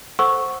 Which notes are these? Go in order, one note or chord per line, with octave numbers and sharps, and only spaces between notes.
A4 C5 F#5 C#6 E6